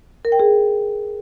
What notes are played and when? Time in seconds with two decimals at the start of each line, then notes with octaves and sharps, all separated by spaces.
0.25 A#4
0.32 G5
0.40 G#4